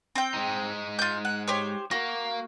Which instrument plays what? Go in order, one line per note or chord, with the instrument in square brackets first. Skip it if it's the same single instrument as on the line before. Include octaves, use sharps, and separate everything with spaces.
[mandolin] C4 G5
[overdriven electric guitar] G#3 D#4
[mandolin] F4 G6
F#5
G4 C5 C#5
[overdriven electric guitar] A#3 A#4 [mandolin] F#4